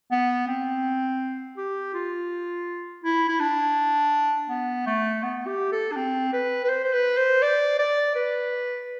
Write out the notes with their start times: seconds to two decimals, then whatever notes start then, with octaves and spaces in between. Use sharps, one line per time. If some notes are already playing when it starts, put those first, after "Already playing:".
0.11 B3
0.48 C4
1.57 G4
1.94 F4
3.04 E4
3.29 E4
3.40 D4
4.49 B3
4.86 A3
5.23 B3
5.47 G4
5.72 A4
5.92 D4
5.96 C4
6.33 B4
6.64 B4
6.69 C5
6.84 C5
6.93 B4
7.17 C5
7.42 D5
7.79 D5
8.15 B4